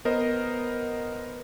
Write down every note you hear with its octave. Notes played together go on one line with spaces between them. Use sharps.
B3 A#4 C5 D#5